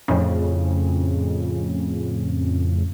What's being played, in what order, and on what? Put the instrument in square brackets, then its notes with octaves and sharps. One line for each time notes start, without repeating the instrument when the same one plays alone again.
[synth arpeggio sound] F2 A2 C#3